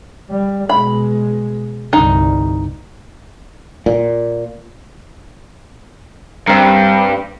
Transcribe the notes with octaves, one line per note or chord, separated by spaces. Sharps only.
G3
B2 G#3 B5
G1 C2 D#4
A#2
G2 C4 A#4